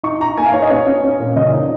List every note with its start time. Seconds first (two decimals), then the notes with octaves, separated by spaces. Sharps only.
0.03 D#4 C#6
0.20 D#4 A#5
0.37 A#3 G#5
0.46 F5
0.54 D#4 C#5
0.62 D#5
0.70 C#4 C#5
0.87 C#4
1.04 C#4
1.19 A#2
1.36 C#3 D#5
1.53 D#4 D#5